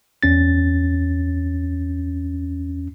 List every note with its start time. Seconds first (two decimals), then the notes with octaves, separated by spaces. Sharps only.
0.23 E2 C#4 A6